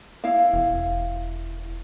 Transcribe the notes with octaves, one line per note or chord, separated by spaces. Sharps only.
E4 F5
E1